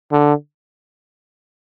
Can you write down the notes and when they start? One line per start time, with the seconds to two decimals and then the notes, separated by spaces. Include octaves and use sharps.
0.12 D3